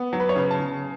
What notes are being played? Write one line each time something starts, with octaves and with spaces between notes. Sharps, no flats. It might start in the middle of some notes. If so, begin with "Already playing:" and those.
Already playing: B3
F#3
B4
C#5
C#3 B4
A5
C#3